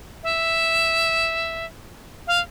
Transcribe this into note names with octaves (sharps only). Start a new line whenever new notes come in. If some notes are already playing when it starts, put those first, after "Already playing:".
E5
F5